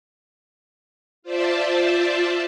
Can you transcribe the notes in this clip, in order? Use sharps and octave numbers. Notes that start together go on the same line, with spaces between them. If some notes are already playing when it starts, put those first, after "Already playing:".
F4 C5 D5 E5 A5